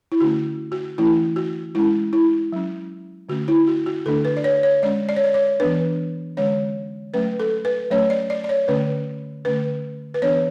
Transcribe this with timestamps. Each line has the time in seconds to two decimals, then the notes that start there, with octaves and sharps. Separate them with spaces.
0.12 E4
0.20 D3 A3 C#4 F#4
0.72 F#4
0.98 E3 A3 C#4 E4
1.36 F#4
1.75 G#3 C#4 E4
2.13 E4
2.52 F#3 C#4
3.29 D3 A3 C#4 F#4
3.48 E4
3.68 F#4
3.86 F#4
4.06 D3 A3 D4 A4
4.25 B4
4.37 D5
4.44 C#5
4.63 C#5
4.83 G#3 C#4 D5
5.09 D5
5.16 C#5
5.24 D5
5.34 C#5
5.60 E3 B3 D4 B4
6.37 D3 G#3 C#4 C#5
7.14 F#3 A3 C#4 B4
7.40 A4
7.65 B4
7.90 F#3 A3 C#4 C#5
8.10 D5
8.30 D5
8.44 D5
8.49 C#5
8.68 D3 A3 C#4 B4
9.45 D3 A3 C#4 B4
10.14 B4
10.22 E3 B3 D4 C#5